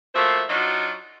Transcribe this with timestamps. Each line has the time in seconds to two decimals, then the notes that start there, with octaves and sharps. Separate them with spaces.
0.15 F3 A3 A#3 F#4 C5 E5
0.49 F#3 D4 D#4 F4 F#4